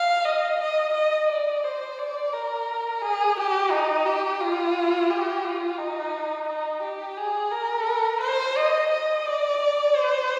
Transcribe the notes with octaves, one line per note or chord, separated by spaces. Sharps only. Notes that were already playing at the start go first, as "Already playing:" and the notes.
Already playing: F5
D#5
D#5
D#5
D5
C5
D5
A#4
G#4
G4
D#4
G4
F4
G4
F4
D#4
D#4
G4
G#4
A#4
C5
D#5
D#5
D5
C5